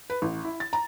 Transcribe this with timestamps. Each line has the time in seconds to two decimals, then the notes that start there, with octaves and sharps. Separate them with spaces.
0.10 B4
0.22 A1
0.44 E4
0.60 A6
0.73 A#5